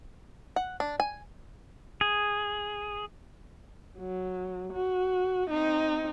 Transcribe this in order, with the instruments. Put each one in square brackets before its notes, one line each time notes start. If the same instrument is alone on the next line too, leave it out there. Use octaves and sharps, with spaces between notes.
[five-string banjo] F#5
D4
G#5
[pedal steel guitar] G#4
[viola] F#3
F#4
C4 D#4